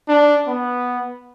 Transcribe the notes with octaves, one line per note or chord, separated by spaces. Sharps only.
D4
B3